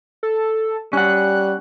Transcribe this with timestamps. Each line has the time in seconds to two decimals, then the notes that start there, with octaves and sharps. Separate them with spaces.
0.23 A4
0.93 G3 C#4 F#5 F#6